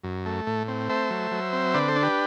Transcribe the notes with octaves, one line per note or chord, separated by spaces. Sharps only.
F#2
A3
A2
C4
A3 C5 E5
F#3
F#3
C4
D3 B4 D5
A4 C5
D4
G4 B4